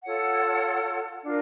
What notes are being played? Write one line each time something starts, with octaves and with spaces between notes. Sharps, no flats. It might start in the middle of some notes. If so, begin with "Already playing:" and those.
F4 A4 C#5 F#5
D4 F4 A#4